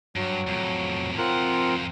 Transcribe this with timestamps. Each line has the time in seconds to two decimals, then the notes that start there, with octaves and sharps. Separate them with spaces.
0.16 G2 F#3
0.47 F2 A2
1.18 F2 C4 F4 A#4 F#5